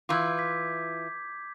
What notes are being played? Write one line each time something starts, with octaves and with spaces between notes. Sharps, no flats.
E3 F4 D6 G6 G#6
D6 B6